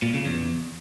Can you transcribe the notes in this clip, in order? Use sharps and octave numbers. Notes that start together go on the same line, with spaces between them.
A#2
C#3
E2